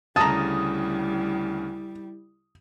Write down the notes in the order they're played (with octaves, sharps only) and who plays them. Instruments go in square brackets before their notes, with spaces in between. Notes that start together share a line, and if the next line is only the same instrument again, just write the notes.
[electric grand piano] D2 C#3 [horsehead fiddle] G3 E4 [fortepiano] A5 A#5 [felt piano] D#6